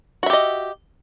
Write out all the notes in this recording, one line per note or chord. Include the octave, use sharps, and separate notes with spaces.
F#4 G4 D#5 E5